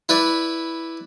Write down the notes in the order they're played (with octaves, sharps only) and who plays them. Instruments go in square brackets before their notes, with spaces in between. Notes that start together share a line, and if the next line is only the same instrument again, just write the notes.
[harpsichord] E4 B4 D5